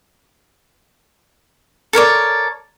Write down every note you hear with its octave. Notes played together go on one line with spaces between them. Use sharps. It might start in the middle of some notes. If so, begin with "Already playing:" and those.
A4 A#4 C#5 D5